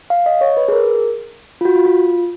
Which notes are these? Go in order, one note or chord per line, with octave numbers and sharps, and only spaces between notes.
F5
D#5
C#5
B4
G#4
A#4
F4
F#4
F4
F4